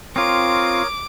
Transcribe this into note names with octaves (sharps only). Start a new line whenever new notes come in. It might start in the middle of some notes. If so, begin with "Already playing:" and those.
C4 F4 A#4 C#5 D6 D#6